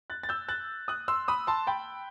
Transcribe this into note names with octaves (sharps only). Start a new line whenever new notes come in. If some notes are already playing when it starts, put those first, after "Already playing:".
F#6 A6
A6
E6 G6
F#6 A6
D#6 F#6
C6 E6
B5 D#6
A5 C6
G5 B5